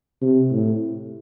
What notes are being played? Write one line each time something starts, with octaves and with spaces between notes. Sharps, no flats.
C3
A2